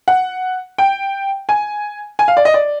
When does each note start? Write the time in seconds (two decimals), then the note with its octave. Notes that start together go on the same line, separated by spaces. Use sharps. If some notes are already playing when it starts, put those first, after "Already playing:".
0.08 F#5
0.78 G5
1.49 G#5
2.19 G#5
2.28 F5
2.37 D5
2.45 D#5
2.54 D5